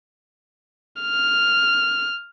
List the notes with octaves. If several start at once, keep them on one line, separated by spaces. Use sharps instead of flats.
F6